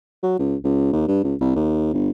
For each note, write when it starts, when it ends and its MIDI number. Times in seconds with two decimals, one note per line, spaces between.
0.23 0.37 54
0.39 0.56 37
0.64 0.89 37
0.93 1.05 39
1.08 1.21 43
1.23 1.35 37
1.41 1.52 36
1.55 1.91 39
1.93 2.10 31